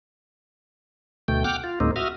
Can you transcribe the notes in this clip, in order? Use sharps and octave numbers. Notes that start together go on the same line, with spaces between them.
D2 B2 A3 G5
F#5 G5 D6 F6
F4
D2 A2 G#3 A#3 C4 D#4
F#4 E5 D#6 F6